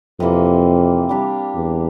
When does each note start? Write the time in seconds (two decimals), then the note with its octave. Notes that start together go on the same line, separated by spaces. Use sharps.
0.19 F2 C3 E3 A#3
1.09 G3 D4 G4
1.55 E2